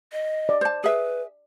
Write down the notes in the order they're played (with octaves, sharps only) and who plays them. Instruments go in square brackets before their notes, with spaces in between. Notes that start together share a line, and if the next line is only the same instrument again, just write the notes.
[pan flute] D#5
[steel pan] D5
[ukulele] C5 A5
[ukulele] G#4 E5 [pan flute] B4